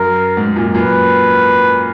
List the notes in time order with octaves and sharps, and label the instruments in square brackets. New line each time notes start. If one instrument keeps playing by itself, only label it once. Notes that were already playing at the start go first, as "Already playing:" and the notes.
Already playing: [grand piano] F#2 [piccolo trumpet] A#4
[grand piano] G#2
G#2
F#2 A#2
[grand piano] F#2 A#2 [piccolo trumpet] B4